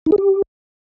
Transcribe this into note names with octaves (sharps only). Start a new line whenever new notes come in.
D#4
G#4
G4